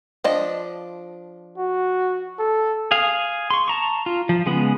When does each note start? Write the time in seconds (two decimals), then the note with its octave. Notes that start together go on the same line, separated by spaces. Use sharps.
0.24 F3 D4 D#5
1.58 F#4
2.39 A4
2.91 G#4 F5
3.50 C6 C#6
3.68 A5 A#5 C#6
4.06 F4
4.29 F3
4.46 C#3 G#3 B3